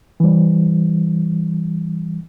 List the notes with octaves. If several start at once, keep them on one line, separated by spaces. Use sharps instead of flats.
E3 G3